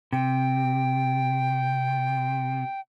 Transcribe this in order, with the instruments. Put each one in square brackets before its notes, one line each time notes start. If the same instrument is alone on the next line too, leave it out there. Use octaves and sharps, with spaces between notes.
[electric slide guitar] C3 [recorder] G5